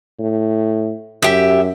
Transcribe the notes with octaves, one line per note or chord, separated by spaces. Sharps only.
A2
F#2 G4 E5